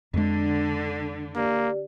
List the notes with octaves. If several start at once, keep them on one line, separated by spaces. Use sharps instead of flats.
F2 D3 G#3
A#3 G4 D5